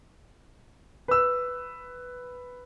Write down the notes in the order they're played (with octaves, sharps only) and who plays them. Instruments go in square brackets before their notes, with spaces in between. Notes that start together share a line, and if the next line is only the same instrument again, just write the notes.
[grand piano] B4 E6